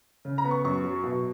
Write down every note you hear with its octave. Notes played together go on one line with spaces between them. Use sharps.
C#3
A#5
B3
C#6
F#2 C#6
F#3
B2